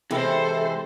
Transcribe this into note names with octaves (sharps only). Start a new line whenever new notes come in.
C3 E3 G#3 E4 A4 C5